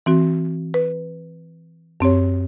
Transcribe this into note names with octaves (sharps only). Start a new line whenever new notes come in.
E3 C4 F#4
B4
F#2 C4 G4 C#5